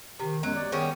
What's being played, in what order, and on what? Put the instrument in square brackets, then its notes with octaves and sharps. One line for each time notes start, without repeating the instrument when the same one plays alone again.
[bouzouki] C3 [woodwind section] D#3
[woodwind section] F#2 G#3 B3 [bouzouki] F#3
[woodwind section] D5
[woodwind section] D#3 A#3 B3 [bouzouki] G3 G#3 C#4